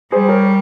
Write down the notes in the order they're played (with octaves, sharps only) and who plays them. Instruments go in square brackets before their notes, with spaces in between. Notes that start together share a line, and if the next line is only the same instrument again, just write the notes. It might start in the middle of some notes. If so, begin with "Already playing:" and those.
[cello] G3 [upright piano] G#4 C5
[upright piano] A#4 C#5